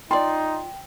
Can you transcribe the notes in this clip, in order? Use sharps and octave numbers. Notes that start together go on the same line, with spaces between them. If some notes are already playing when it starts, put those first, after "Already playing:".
D#4 F4 D5 G5 C6